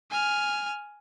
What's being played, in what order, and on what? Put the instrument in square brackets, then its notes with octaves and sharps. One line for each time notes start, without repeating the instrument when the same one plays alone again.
[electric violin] G#5 F6